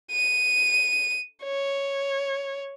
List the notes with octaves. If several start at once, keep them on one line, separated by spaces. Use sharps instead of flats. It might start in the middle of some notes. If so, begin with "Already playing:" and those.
D#7
C#5